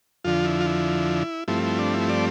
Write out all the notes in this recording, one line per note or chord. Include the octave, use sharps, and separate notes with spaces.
F2 D3 F3 F4
E4
F4
E4
G2 F3 A3 C4 E4
E4
D4
E4
D5